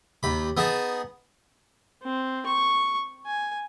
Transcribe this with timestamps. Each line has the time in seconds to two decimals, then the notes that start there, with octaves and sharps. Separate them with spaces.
0.23 D#2 B5
0.57 B3 D#4 G#4 A5
2.03 C4
2.46 C#6
3.26 G#5